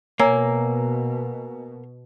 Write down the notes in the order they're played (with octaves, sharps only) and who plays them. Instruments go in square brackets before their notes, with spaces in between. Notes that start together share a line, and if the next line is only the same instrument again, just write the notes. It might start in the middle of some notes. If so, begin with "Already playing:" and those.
[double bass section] B2 [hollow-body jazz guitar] A#3 [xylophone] C#5 [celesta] G#5 A#5 E6